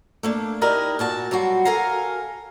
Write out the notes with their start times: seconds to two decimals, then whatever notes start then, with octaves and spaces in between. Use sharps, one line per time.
0.23 A3 A#3 D4
0.61 D#4 E4 G4 A#4 D5 D#5
0.99 A#2 F#4 A5
1.31 F#3 G3 F4 F#4
1.65 A4 A#4 F5 G#5 A#5